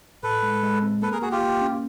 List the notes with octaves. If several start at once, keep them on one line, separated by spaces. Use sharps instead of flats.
A2 A4 B4
G#3
G#3
C4
A#3 A4 B4
G#4 A#4
A#3 F#4 G#4
F4 G4
A#3
C#4